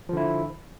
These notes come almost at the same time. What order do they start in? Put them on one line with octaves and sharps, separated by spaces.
F3 D3 E4